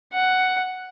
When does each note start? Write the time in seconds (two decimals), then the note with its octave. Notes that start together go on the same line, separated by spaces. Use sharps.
0.13 F#5